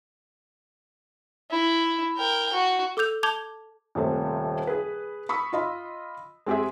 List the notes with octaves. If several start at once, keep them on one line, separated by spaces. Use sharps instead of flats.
E4
A#4 G5
F#4
A4 D6 E6 G6 F7
A5 D6 G6 G#6 F7 G7
D#1 C3 A3 C5
G#4 B4
B5 C#6 D#6 E6
F4 D#5 B5
G#3 C4 G4 G#4 E5